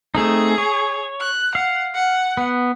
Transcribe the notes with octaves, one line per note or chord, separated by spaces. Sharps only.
A3 C4 D#4 G#4
C#5
F#6
F5 F#5
F#5
B3